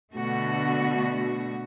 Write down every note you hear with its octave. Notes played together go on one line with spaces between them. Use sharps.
B2 D3 A3 F#4